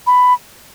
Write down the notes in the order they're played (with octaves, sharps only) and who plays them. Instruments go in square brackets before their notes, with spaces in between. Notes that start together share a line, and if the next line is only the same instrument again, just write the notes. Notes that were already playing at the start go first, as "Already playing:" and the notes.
[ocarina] B5